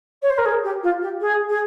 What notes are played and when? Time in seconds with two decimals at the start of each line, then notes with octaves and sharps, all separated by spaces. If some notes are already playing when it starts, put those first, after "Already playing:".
0.22 C#5
0.30 C5
0.38 A#4
0.45 G#4
0.64 G4
0.83 F4
1.01 G4
1.20 G#4
1.49 G#4